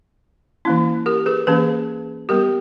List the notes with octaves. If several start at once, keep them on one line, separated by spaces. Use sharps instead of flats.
E3 A#3 C#4 E4
G4 A#4
G#4 B4
E3 A#3 C#4 G#4 B4
G3 B3 G4 A#4